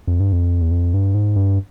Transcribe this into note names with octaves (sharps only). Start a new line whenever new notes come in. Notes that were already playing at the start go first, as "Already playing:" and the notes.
F2
G2
F2
E2
F2
G2
G#2
G2